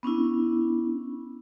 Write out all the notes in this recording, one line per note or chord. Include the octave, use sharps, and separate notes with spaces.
B3 C#4 D4 E4